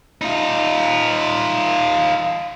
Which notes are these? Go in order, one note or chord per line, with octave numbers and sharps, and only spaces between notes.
D#4 F4